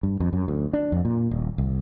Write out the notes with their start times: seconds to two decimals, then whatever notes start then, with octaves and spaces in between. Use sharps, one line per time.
0.03 G2
0.20 F2
0.33 F#2
0.48 D2
0.73 D4
0.92 F2
1.05 A#2
1.31 D#1
1.58 C2